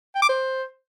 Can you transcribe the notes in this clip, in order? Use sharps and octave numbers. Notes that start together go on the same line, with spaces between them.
G5
D6
C5